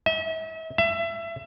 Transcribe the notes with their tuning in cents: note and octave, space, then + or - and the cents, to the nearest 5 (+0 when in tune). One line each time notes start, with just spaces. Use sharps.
E5 -40
E5 +25